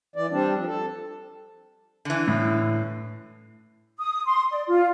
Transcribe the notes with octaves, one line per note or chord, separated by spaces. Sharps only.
E3 D5
G3 C4 D4
F3
A4
D3 E3
A2
D#6
C6
D5
F4